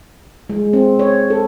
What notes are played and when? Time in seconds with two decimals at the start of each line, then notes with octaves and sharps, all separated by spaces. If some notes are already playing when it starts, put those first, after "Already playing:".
0.50 G#3
0.73 C4
0.99 C#5
1.30 A4